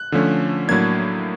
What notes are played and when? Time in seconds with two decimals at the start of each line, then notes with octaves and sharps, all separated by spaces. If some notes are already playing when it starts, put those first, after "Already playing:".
Already playing: F#6
0.12 D3 F3 A3 C#4
0.68 A2 F#3 A#3 D4 G#6